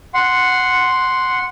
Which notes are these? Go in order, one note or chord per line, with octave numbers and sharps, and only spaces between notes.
F#5 C6